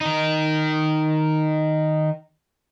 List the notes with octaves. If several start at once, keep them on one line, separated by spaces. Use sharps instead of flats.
D#3 D#4